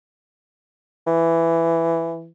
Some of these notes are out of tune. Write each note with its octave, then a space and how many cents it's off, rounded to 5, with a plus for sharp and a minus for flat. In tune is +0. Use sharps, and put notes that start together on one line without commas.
E3 +10